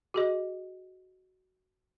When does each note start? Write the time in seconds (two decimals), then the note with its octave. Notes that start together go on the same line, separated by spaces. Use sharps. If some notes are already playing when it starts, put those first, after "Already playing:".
0.14 F#4 G#4 D#5